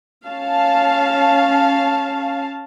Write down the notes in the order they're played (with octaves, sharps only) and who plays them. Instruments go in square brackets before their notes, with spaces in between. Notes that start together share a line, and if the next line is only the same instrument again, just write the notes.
[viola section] C#4 F5 A5